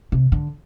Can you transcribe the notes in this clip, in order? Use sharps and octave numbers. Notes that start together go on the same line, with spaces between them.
C3
D3